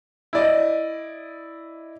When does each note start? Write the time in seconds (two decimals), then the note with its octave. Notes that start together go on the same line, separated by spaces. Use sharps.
0.33 E4 D5 D#5